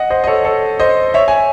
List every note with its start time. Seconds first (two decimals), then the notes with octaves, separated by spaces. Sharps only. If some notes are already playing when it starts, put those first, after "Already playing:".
Already playing: D#5 F#5
0.10 C5 D#5
0.24 D#5
0.27 A4 C#5
0.45 A4 C#5
0.80 C5 D#5
1.14 C#5 E5
1.28 G#5